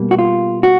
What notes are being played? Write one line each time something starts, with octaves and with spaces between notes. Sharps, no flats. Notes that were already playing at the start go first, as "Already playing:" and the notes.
Already playing: B2 G3 A#3
F#4
F4
F#4